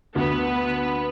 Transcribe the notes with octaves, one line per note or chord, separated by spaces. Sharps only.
D2 B3 B4